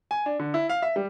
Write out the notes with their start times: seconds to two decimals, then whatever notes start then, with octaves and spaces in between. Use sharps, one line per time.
0.11 G#5
0.26 D4
0.39 D3
0.54 E4
0.69 F5
0.82 E5
0.96 G3